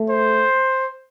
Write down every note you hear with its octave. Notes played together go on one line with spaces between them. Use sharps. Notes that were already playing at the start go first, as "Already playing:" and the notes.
Already playing: A3
C5